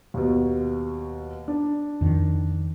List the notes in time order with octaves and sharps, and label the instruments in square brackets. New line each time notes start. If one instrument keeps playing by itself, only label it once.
[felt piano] D#2 B2
D4
[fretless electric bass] F2 D#3